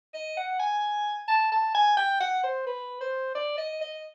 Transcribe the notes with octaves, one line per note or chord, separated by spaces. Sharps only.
D#5
F#5
G#5
A5
A5
G#5
G5
F#5
C5
B4
C5
D5
D#5
D#5